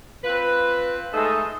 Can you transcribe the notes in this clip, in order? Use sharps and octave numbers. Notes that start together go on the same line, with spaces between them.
C4 F4 B4
G#3 A3 D#4 A4 D#5